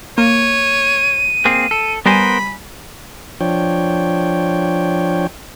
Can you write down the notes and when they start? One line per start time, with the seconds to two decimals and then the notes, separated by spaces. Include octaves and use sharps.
0.18 A#3 C#5 D#7
1.45 A#3 C4 G#4
1.71 A4
2.06 G3 B3 A#4 C5 G#5 B5 D#7
3.41 F3 D4 C#5 G5